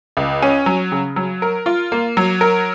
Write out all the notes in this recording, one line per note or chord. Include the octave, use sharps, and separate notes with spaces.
C#2
C#4
F#3
C#3
F#3
A#4
F4
A#3
F#3
A#4